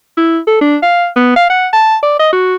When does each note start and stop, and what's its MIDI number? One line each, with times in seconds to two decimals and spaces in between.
0.17 0.38 64
0.47 0.59 69
0.61 0.76 62
0.82 1.07 77
1.16 1.33 59
1.36 1.46 77
1.50 1.67 78
1.73 1.96 81
2.03 2.18 74
2.19 2.29 75
2.33 2.55 66